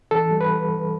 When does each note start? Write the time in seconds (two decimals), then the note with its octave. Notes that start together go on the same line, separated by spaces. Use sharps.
0.11 E3 A4
0.31 G3
0.41 B4